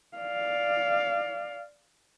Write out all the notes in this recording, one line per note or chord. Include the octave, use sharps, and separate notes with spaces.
D5 F5